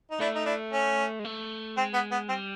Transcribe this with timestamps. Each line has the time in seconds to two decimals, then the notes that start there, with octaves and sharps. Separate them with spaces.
0.10 D#4
0.20 A3 D4 E4
0.35 D#4
0.46 D4 E4
0.73 C#4
1.19 G#3
1.25 A3
1.77 G#3 C4
1.94 B3
2.12 B3
2.29 G3 C4